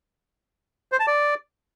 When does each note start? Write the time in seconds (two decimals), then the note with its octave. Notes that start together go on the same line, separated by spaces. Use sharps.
0.92 C5
1.00 A5
1.07 D5